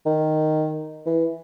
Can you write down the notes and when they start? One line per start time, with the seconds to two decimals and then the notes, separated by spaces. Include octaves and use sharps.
0.06 D#3
1.06 E3